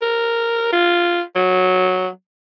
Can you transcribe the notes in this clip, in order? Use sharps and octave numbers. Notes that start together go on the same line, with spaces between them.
A#4
F4
F#3